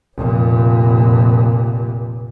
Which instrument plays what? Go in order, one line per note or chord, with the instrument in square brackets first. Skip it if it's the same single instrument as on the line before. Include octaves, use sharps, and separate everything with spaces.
[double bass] F1 A#2